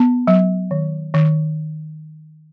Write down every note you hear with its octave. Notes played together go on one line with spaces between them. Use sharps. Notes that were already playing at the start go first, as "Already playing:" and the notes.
Already playing: B3
F#3
D#3
D#3